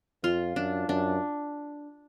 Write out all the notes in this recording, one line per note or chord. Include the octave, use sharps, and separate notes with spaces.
F2 F4
F#2 D4
F#2 D4